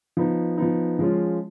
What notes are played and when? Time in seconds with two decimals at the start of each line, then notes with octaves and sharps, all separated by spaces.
0.17 F3 B3 D#4
0.57 F3 B3 D#4
0.99 F3 G#3 C#4 F4